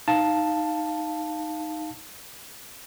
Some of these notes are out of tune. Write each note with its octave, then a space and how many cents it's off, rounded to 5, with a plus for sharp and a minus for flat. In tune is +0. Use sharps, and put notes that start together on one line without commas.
D#4 +0 F5 +0 A5 +0